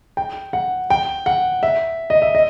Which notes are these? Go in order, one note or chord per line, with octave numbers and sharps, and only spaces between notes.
G5
F#5
G5
F#5
E5
D#5
E5
D#5